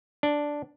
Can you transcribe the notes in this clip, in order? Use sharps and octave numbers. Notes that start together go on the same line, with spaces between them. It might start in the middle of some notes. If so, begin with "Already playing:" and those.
D4